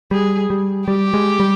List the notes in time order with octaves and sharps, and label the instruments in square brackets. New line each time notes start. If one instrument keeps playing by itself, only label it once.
[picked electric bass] G3 [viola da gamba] G#4
[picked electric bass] G3
[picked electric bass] G3 [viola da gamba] G4
[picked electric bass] G#3
G3